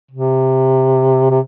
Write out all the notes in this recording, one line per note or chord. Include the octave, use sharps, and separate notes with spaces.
C3
C3